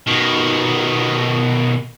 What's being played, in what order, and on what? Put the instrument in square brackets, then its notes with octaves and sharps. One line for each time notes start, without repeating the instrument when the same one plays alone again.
[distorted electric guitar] B2 D#3